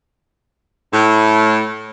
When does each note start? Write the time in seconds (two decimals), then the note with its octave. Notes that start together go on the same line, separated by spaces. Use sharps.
0.93 A2